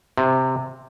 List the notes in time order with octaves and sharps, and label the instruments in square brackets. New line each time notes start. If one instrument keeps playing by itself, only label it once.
[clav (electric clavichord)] C3